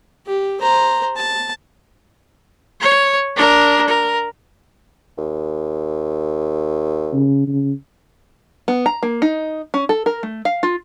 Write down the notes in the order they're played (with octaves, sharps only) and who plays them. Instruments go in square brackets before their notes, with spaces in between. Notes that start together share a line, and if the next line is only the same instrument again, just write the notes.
[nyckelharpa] G4
C5 A#5
A5
[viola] C#5
D4 A#4
A#4
[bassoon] D#2
[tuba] C#3
C#3
[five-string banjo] B3
A#5
A#3
D#4
C#4
A4
A#4
A3
F5
F4